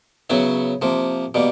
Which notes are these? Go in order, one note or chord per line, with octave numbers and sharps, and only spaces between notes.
C#3 F#3 B3 E4
C3 F3 A#3
B2 G3 A#3